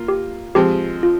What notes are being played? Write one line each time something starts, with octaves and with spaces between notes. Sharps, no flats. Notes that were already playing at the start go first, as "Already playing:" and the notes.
Already playing: A#3 F4
G4
F3 G#3 C4 G4
F4